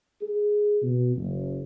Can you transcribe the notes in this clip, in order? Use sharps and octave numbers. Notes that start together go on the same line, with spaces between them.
G#4
B2
F#1